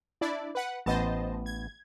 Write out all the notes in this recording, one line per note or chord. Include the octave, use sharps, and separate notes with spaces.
D4 E4 D5
B4 F#5
A1 B3 C5 D#5 A5
G#6